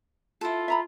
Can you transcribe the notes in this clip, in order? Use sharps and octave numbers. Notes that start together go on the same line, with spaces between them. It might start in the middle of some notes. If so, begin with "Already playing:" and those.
E4 F4 A4
E5 A#5 B5